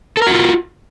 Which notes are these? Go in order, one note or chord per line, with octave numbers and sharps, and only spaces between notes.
F4 F#4 A4 A#4